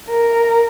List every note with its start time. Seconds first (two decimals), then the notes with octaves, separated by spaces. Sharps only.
0.10 A#4